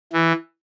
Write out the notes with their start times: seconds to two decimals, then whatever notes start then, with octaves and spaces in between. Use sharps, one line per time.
0.13 E3